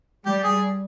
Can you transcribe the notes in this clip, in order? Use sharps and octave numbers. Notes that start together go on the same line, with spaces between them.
G3 G4
G#4